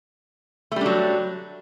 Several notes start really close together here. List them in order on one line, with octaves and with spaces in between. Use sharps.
A3 G3 D4 F#3